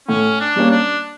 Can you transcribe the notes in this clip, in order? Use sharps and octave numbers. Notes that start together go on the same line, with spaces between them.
A2 C#4
D4
G3 A#3 C#4
D4